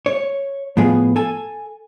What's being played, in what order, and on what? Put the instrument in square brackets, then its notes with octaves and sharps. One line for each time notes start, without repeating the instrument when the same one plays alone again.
[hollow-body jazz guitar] C#5
A2 F3 B3 G#4
A4 G#5